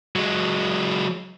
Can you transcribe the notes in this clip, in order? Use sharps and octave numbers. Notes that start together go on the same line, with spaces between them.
F#3 G#3